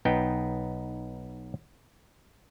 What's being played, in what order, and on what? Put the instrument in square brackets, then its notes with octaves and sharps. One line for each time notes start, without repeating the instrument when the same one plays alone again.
[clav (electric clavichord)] B1 B3 D#4 G5